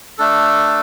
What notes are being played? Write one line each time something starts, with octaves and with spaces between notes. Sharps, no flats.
A3 D4 A4